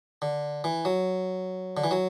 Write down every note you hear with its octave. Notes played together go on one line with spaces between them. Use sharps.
D3
E3
F#3
D3
E3
F#3